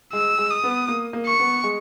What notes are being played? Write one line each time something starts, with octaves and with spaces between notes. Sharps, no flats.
G#3 E6
G#3
D#6
B3
A#3
A#3
C#6
B3
G#3